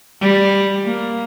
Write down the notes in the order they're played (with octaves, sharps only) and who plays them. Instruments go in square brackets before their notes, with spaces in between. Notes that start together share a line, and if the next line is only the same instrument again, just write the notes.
[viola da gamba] G3
A#3